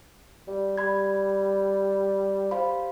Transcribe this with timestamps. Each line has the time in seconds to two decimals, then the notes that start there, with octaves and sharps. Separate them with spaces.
0.47 G3
0.77 G3 B5 G#6
2.51 G4 C5 F5 B5